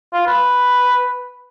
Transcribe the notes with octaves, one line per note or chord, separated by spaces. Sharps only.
F4
B4